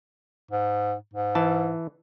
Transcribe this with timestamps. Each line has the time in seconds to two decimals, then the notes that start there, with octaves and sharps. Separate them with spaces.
0.51 G#2
1.13 G#2
1.35 E3 A5